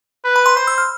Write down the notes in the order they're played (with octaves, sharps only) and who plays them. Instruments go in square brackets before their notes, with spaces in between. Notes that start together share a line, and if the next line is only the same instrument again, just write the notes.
[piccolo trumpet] B4
[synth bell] B5
C6
[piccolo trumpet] C5 [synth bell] C6
[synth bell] E6
F6